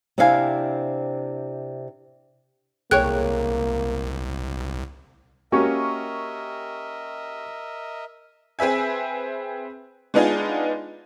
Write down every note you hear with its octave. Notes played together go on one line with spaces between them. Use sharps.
C3 C4 D4 E4 F5 G#5
C2 A#3 G#4 C#5 G5 F#6
A#3 C#4 F#4 G4 A#4 D#5 E5 C#6
C4 G#4 B4 E5 G#5
G#3 B3 D4 D#4 F4 G#4